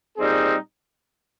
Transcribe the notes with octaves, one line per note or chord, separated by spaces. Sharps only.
A#2 G3 C4 D#4 G#4